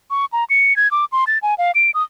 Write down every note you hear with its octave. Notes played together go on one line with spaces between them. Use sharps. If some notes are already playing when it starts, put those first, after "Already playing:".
C#6
A#5
C#7
G#6
D6
C6
A6
G#5
F5
D7
D#6